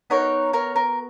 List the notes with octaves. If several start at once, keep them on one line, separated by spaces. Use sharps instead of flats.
B3 D#4 F#4 A#4 C#5
A#4 C#5
A#4